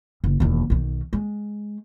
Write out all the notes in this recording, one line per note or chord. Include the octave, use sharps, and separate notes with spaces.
F#1
E1 D#2
B1 D#3
G#3